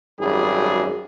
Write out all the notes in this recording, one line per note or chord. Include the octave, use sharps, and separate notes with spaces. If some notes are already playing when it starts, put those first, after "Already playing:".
G#1 F#2 G3 G#4